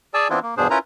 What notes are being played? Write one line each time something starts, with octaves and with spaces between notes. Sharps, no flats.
G#4 D5 G#5 A5 E6
E3 B3 C4 D4 E4 F4
A#3
E2 G2 B2 D4 G#4 C5
C#4 E4 F4 A#4 B4 A#5